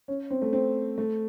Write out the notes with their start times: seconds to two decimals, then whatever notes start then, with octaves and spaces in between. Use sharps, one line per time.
0.08 C#4
0.30 C4
0.42 A3
0.53 C4
0.98 A3